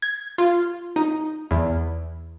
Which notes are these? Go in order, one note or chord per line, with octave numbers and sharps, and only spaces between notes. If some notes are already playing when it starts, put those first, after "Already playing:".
G#6
F4
D#4
E2